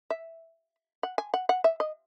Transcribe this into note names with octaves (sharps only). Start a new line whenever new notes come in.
E5
F#5
G#5
F#5
F#5
E5
D#5